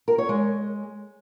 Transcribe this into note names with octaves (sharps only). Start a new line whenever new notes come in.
A#4
C#5
G#3